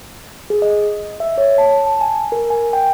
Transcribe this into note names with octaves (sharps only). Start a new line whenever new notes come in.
G#4
D#5
E5
C#5
A5
A5
G#5
A#4
G#5
G5